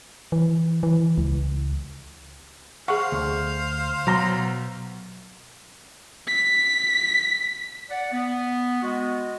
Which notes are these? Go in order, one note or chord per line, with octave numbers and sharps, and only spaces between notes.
E3
E3
C#2
G#4 C5 F5 F#5 C#6
D2
B2 F#3 A#5 C6
B6
D5 F#5
B3
G#3 B3 F#4